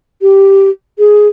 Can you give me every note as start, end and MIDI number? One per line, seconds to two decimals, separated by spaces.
0.22 0.70 67
0.98 1.28 68